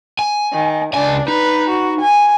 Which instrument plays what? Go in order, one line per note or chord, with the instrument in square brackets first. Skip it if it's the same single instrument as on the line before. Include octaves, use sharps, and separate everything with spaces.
[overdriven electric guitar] G#5
[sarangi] D#3
[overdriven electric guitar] C#2 G#5 [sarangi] D4
[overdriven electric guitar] D#4 [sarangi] B4
[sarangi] F#4
G#5